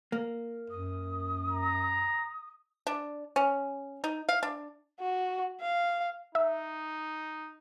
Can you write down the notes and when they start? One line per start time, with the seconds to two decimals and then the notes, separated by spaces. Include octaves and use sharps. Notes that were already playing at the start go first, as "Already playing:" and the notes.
0.12 A#3
0.70 F#2 D#6
1.50 A#5
2.87 D4
3.36 C#4
4.04 D#4
4.29 F5
4.43 D4
5.00 F#4
5.61 F5
6.35 D#4 E5